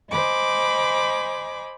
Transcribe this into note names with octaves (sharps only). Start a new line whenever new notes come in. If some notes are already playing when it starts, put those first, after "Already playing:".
C5 D#5 G#5 B5 D6